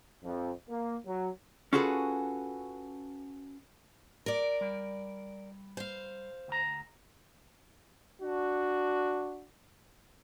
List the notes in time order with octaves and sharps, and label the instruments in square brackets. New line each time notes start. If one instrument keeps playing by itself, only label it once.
[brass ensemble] F2
A#3
F#3
[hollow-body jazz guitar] C#4 F4 F#4 G#4 A4 B4
[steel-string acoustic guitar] A#4 D5
[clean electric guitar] G3
[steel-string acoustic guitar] C5 F5
[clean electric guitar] D2 A#5
[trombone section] D4 F#4